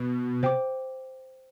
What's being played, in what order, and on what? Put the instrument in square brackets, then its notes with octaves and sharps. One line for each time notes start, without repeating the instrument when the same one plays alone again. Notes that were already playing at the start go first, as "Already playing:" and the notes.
Already playing: [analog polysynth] B2
[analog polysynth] C3 [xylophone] C5 G5 D6